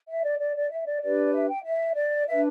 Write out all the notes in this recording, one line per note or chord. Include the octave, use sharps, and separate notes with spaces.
E5
D5
D5
D5
E5
D5
D4 G4 B4 D5
E5
G5
E5
D5
D4 B4 E5